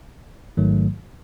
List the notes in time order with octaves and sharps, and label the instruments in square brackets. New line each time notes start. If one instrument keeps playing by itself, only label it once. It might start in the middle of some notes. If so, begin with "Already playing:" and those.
[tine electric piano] A1 G#2 D#3 F#3 A3